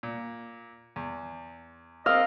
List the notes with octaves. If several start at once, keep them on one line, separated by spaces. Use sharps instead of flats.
A#2
E2
C4 A#4 D#5 F5 E6